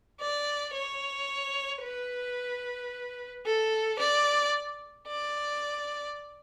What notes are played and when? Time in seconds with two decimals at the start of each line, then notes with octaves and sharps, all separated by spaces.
0.21 D5
0.74 C#5
1.83 B4
3.46 A4
3.99 D5
5.08 D5